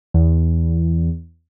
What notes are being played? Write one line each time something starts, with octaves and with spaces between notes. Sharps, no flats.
E2